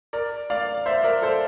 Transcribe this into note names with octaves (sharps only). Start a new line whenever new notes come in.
A#4 D5
D5 F5
C5 E5
A#4 D5
A4 C5